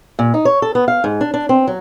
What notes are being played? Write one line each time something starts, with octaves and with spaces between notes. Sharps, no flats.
A#2
D#4
C#5
A4
B3
F5
G#2
D4
D4
C4
F#3